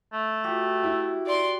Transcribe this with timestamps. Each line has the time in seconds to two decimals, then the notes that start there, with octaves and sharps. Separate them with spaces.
0.13 A3
0.44 F#4 G4
0.83 E4
1.27 D5 C6